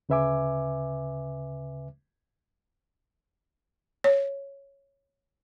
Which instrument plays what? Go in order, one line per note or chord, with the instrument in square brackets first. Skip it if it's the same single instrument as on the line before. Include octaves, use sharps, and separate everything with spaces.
[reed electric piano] D2 C#3 B4 E5 G#5 D6
[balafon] C#5